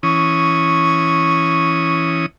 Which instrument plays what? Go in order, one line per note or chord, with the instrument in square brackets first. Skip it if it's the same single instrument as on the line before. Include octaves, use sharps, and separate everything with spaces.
[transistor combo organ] E3 C#4 D#6 [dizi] C#6